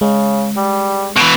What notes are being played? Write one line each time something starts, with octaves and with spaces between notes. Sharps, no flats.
C#3 G#3
G3
B2 E3